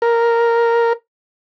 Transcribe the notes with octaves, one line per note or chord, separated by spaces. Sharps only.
A#4